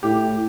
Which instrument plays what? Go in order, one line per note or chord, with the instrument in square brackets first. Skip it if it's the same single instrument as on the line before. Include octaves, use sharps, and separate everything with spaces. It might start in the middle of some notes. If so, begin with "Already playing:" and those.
[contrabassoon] A2 [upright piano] G4